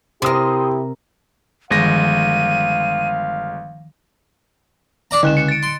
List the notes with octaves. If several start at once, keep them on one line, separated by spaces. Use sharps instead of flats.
C3 E4 G4 A#4 C6 D#6
G1 D#3 F3 G#3 F5 A#6 D#7
D4 D5 A#5
C#2 D3 F#6 E7
C#7
A6 D7
C6